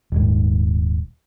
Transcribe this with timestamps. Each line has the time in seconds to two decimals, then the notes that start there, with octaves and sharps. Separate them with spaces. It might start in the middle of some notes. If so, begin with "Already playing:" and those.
0.12 D#1 G#2